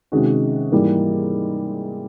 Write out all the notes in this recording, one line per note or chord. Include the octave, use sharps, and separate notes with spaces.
C3 D#3 G#3 C#4 F#4
G#2 E3 G3 A#3